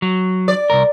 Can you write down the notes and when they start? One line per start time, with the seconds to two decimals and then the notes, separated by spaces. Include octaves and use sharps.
0.02 F#3
0.48 D5
0.70 C2 F2 A#4